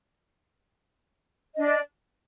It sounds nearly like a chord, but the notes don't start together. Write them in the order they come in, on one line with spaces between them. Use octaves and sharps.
D#5 D4 D5